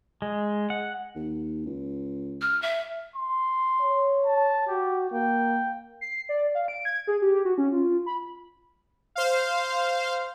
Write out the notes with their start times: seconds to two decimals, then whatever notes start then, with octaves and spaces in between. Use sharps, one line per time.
0.22 G#3
0.70 F#5
1.15 D#2
1.66 C#2
2.41 F6
2.62 E5
3.16 C6
3.81 C#5
4.26 A5
4.68 F#4 G4
5.12 A#3 G5
6.01 C7
6.29 D5
6.55 F5
6.68 D7
6.85 G#6
7.07 G#4
7.22 G4
7.45 F#4
7.58 C#4
7.72 F4
8.06 B5
9.15 C5 F5